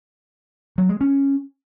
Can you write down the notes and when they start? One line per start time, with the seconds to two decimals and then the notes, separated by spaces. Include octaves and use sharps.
0.78 F#3
0.89 G#3
1.01 C#4